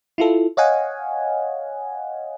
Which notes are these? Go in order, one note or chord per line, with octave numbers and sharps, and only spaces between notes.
E4 F4 A4
C#5 D#5 F5 F#5 G#5